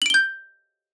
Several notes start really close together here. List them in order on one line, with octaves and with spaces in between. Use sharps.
F#7 D7 G7 G6